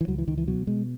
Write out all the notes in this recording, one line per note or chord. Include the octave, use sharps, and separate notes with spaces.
E3
C#2 F#3
E3
C#2 D#3
E3
B2 F#3
B2 G#3